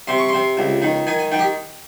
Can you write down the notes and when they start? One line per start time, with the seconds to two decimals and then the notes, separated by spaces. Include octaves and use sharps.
0.08 C3 C6
0.18 C#6
0.29 C3 C6
0.57 C#2
0.82 D#3
1.07 D#3 G#5
1.19 G#5
1.32 D#3 G5
1.39 G4